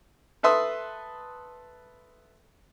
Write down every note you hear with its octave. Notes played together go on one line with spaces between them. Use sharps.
A4 B4 E5 C6 D#6